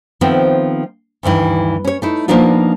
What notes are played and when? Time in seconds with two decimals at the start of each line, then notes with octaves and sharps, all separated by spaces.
0.21 D#3 F3 A3 B3 C4
1.23 D2 G2 D#3 E3
1.85 C#4 C#5
2.02 A3 D#4 E4
2.28 F3 A#3 B3 D4 D#4 F4